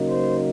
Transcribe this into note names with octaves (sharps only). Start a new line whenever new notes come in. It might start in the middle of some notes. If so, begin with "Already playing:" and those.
Already playing: C#3 F#3 A#3 D#4
C5